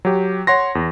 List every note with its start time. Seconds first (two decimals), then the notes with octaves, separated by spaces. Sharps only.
0.05 F#3 G4
0.47 C#5 F#5 C6 A#6
0.75 E2